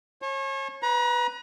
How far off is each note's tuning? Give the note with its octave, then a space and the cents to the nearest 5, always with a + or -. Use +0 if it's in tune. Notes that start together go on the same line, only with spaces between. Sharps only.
C#5 -35 A5 -45
B4 +5 A#5 +40